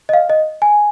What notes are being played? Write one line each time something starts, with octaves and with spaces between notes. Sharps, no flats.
D#5
F5
D#5
G#5